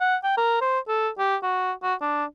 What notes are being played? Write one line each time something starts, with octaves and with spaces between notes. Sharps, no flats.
F#5
G5
A#4
C5
A4
G4
F#4
F#4
D4